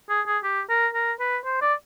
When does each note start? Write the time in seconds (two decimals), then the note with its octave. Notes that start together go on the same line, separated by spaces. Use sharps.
0.10 G#4
0.27 G#4
0.44 G4
0.70 A#4
0.95 A#4
1.20 B4
1.45 C5
1.62 D5